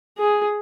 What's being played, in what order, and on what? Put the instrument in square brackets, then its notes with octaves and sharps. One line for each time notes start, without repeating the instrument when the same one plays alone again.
[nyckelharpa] G#4